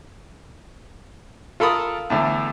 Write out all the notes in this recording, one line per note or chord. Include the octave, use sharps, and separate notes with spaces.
F4 A4 A#4 B5 D#6
E2 A2 D3